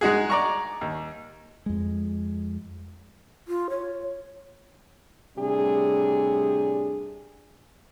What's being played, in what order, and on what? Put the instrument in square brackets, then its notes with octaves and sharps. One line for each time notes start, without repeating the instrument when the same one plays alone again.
[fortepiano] G#3 D#4 F#4 G#4
D5 A#5 C#6
D#2
[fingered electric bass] F2 G#3
[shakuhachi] F4
C#5
[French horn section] A2 C3 G3 D4 G#4